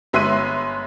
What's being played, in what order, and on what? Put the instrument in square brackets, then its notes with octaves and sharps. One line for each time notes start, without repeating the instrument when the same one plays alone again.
[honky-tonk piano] G1 G#3 E5 C6 F#6 D#7